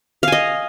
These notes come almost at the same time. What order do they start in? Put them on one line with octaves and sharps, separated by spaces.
F5 G#5 D#5